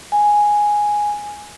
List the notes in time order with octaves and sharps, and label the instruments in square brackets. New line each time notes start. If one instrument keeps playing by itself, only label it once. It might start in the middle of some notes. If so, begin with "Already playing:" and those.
[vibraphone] G#5